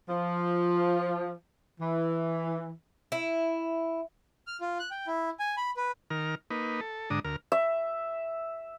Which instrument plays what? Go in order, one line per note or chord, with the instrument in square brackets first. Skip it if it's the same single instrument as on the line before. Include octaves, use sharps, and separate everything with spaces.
[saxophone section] F3
E3
[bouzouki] E4
[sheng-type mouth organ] F6
F4
F#6
G5
E4
G#5
B5
B4
[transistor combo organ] D#3 A#4 F6
A#3 D#4 B4
A4
G#2 D3 D4 A#5 D#6
D2 A#4 F6
[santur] E5